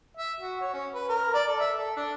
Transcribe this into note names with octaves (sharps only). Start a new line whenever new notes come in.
E5
F#4
C#5
C#4
B4
A#4
D5
A4
E5
A4
D4